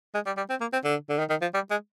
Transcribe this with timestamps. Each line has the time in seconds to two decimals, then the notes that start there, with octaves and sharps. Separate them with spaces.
0.14 G#3
0.26 G3
0.37 G3
0.50 C4
0.61 A#3
0.73 C4
0.84 D3
1.09 D3
1.19 D#3
1.30 D#3
1.42 F3
1.54 G3
1.70 G#3